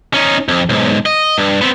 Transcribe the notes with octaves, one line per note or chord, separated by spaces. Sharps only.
C#4 D#4
F2
B1 G#2
D#5
G2
B3 C4